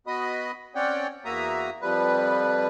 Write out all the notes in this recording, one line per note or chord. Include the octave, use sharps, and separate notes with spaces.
B3 F#4 D#5 B5 D#6
C4 C#4 C#5 D5 F#5 G5
E2 A#3 F#4 E5 A#5 D#6
F2 F3 G3 B4